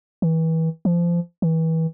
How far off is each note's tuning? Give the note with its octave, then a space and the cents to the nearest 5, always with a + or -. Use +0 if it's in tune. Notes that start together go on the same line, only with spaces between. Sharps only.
E3 -30
F3 -25
E3 -30